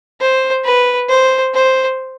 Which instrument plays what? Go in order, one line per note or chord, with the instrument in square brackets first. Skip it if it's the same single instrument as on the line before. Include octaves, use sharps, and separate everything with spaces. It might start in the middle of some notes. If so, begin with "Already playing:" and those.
[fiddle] C5
B4
C5
C5